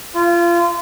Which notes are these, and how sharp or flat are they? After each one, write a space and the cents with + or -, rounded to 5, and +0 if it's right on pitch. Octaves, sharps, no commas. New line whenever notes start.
F4 -25